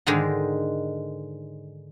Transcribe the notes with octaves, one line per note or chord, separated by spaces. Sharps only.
G#2 D3 D#3 G#3